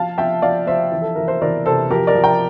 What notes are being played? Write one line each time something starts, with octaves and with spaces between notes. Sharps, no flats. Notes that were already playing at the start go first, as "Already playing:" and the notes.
Already playing: F3 F5 A5
F3 E5 G5
F3 D5 F5
F3 C5 E5
E3
A4
E3 A#4
C5
E3 A#4 D5
C3 A4 C5
F3 G4 A#4
A#4 D5
F3
G5 A#5